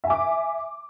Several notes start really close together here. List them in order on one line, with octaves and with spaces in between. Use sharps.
E5 G#5 D6